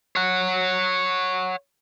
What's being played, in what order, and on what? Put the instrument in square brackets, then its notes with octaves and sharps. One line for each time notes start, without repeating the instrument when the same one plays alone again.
[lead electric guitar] C#5 F#5